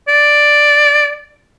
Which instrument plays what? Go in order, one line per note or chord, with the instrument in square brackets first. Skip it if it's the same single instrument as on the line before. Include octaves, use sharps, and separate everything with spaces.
[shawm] D5